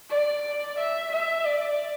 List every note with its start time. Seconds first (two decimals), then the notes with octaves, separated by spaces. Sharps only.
0.10 D5
0.78 E5
1.12 E5
1.45 D5